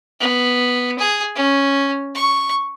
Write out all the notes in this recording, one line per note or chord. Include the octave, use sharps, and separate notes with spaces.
B3
G#4
C#4
C#6